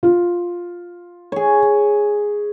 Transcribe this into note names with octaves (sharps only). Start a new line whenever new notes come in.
F4
G#4 C#5